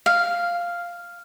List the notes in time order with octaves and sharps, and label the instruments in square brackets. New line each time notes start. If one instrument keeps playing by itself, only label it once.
[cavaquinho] F5